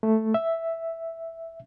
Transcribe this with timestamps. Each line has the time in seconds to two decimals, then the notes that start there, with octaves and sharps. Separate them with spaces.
0.03 A3
0.34 E5